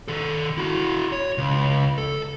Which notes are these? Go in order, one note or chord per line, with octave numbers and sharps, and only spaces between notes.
D#3 A4
E4 F#4
C#5
C#2
A4